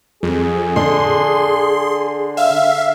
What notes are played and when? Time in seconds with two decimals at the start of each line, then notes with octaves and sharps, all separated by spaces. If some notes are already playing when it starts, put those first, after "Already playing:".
0.23 F2 G#4
0.76 D3 C6
2.37 E5 F5